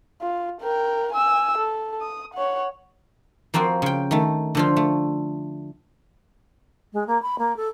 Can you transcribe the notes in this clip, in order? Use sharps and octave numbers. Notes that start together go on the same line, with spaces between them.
F4
A#4 G5
G#5 E6
A4
D#6
C#5 F#5
F3 A#3 C4 F4 F#4
C#3 G5
D#3 A3
D3 F3 F4
A3
G#3
A#3
B5
A#3
A4